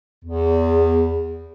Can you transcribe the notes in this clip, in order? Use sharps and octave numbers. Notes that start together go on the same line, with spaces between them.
E2